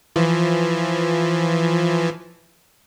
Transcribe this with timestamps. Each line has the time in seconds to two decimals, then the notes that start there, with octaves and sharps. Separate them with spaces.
0.16 E3 F3